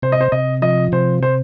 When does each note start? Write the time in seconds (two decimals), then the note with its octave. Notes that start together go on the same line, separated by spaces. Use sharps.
0.02 C3 C5
0.12 D#5
0.21 C5
0.32 C3 D#5
0.62 F3 D#5
0.92 C3 C5
1.23 C5